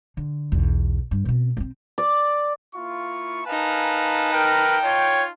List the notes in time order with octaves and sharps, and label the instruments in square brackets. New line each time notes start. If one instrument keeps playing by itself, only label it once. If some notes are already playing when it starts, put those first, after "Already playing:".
[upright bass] D3
B1 E2
G2
B2 C4
B3 C4
[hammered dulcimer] D5
[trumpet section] A#3 E4 F4 [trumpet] C#6
[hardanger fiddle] D#4 A5 [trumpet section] A#4 F5 G#5 [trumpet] B4
[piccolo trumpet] A#4 [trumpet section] G5
[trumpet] F4 [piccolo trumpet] C#5